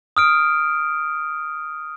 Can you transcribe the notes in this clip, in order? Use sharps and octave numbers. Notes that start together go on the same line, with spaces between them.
D#6 F6 D7